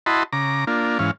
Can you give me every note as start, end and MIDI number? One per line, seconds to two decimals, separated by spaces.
0.06 0.23 64
0.06 0.23 66
0.06 0.23 75
0.06 0.23 81
0.06 0.23 83
0.06 0.23 84
0.33 0.65 49
0.33 0.65 82
0.33 0.65 86
0.67 0.98 58
0.67 0.98 62
0.67 0.98 65
0.99 1.11 44
0.99 1.11 52
0.99 1.11 61
0.99 1.11 77